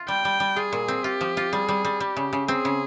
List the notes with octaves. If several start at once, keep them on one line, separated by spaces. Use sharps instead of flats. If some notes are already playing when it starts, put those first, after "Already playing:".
Already playing: F4
G3 G5
G3
G3
F4 G#4
A#2
C4
F4 G4
F3
F4
G3 G#4
G3
G3
G3 G4
C#3
C#3
C4 G#4
C#3